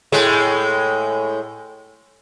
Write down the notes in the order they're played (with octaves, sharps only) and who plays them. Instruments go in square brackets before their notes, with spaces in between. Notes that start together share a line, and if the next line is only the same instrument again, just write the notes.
[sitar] A2 G#3